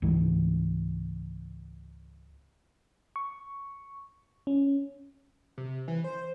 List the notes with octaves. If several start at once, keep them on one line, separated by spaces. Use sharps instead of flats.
C#2 G#2 E3 A3
C#6
C#4
C3
E3
C5